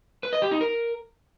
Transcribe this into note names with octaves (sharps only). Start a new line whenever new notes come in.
B4
D#5
G4
D#4
A#4